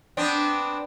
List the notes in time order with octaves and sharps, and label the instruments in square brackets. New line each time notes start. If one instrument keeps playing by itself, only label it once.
[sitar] B3 C4 D4